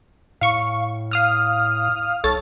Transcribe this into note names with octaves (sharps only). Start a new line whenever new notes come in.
A2 F5 C#6
F5 D#6 F6
B1 A4 C#5 A6